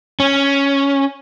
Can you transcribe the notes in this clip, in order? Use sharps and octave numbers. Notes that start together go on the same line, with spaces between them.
C#4